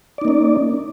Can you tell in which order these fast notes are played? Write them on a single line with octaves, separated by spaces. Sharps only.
D5 D#4 A#3 C#4